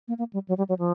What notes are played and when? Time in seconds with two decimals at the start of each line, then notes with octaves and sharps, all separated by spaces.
0.08 A#3
0.18 A#3
0.33 G3
0.48 F#3
0.58 G3
0.69 F#3
0.79 F3